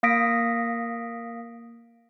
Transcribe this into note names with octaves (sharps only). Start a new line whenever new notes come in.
A#3 F5 D#6 A#6 B6 D7